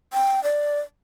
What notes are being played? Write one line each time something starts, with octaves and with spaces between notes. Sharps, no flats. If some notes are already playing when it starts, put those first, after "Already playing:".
G5
D5